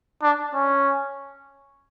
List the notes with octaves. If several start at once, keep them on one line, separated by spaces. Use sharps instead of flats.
D4
C#4